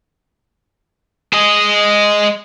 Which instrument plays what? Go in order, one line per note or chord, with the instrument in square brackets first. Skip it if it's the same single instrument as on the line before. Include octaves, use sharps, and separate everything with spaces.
[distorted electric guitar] G#3 D#5